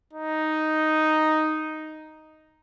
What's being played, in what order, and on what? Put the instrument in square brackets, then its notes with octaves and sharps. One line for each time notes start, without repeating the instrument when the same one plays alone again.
[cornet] D#4